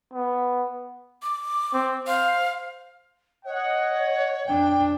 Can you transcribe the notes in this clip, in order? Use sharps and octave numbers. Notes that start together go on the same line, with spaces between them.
B3
D6
C4
C5 F5
C#5 D#5 F#5
F2 D4 G5